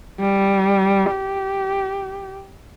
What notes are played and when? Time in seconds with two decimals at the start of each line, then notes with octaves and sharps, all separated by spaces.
0.20 G3
1.11 G4